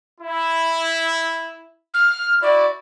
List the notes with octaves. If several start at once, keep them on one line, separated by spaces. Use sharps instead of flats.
E4
F6
E4 F#4 D5